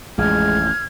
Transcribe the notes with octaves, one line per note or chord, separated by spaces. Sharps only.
A1 F2 G#3 F6 G#6